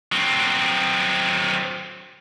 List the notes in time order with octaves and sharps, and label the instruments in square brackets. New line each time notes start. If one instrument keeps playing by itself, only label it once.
[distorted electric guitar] F#3 C4